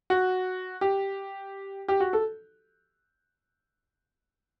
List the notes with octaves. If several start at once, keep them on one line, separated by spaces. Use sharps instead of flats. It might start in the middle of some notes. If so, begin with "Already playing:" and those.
F#4
G4
G4
F#4
A4